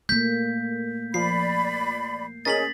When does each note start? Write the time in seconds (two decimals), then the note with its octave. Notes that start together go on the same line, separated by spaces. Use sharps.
0.09 A3 A#3 G6 B6
1.14 F3 D5 B5 C7
2.45 C#4 G#4 A#4 D#5 A6 B6 F#7